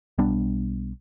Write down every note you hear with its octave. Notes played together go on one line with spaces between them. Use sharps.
B1 G3 B3 D4